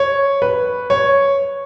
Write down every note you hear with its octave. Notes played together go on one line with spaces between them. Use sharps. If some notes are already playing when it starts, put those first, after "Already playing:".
Already playing: C#5
B4
C#5